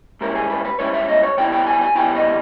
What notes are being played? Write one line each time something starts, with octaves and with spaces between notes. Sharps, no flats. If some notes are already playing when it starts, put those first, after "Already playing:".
G#2 G3 C#4 E4 A#4
G#4
B4
B4
G#2 G3 C#4 E4 C#5
E5
D#5
C#5
C#3 G3 B3 E4 G5
G5
G#5
G#5
C#3 G3 B3 E4 G5
D#5